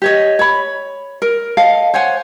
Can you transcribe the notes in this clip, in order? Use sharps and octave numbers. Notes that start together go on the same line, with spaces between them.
G4 C#5 D#5
C#5 B5
A#4
A4 D#5 F5
C5 C#5 F#5 G#5